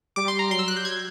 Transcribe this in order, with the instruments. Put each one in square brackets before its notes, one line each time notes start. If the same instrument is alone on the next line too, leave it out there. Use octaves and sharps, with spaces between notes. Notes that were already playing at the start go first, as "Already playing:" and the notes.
[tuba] G3 [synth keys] D6
[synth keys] C6
A#5
[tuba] F#3 [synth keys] C6
[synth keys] E6
F#6
G6
G#6